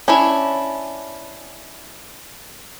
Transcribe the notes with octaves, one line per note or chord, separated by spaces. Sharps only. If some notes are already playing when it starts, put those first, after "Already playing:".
C#4 D4 E4 C#5